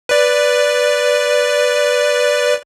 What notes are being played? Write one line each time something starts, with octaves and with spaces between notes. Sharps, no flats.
B4 D5